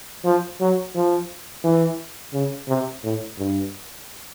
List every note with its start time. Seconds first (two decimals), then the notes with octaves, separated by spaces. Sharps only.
0.25 F3
0.61 F#3
0.95 F3
1.64 E3
2.33 C#3
2.69 C3
3.04 A2
3.38 G2